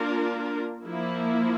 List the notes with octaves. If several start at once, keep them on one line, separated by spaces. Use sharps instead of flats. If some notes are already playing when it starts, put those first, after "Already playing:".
Already playing: A#3 D4 F4 A#4
F3 A#3 E4